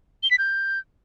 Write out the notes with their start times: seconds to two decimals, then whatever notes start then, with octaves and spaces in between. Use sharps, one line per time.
0.23 G7
0.31 B6
0.39 G6